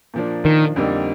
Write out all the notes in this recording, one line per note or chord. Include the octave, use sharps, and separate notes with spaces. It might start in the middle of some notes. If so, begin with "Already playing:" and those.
A#2 F3 A#3 D4
D#3
F2 D3 G3 A#3 D#4